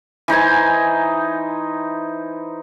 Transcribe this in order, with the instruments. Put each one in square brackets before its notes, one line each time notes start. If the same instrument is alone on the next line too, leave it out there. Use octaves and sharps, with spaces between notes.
[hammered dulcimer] E3 D#4 C5 G#5